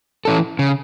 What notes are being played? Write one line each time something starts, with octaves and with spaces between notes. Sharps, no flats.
E3 C#4 A4
C#3